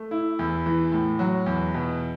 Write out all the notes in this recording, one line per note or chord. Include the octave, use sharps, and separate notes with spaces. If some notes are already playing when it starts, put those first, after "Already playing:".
Already playing: A3
E4
E2
E3
A2
F#3
E2
B2